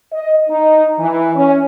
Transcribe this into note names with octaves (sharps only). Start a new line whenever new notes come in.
D#5
D#4
E3
C#4